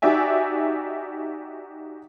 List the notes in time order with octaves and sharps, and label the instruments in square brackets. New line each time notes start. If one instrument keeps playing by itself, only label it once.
[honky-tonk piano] D#4 F#4 G4 D5 E5 G#5